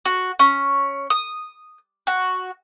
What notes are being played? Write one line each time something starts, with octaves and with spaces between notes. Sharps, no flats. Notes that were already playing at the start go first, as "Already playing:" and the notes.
F#4
C#4
D#6
F#4